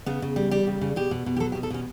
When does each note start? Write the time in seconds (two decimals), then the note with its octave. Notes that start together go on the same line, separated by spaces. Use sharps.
0.06 C#3 B3
0.22 C#3
0.36 G3
0.51 G3 G4
0.67 C#3
0.81 C#3
0.96 B2 G4
1.11 B2
1.26 B2
1.36 G4
1.40 F#3 A4
1.52 G4
1.55 B2
1.63 A4
1.70 B2 C#4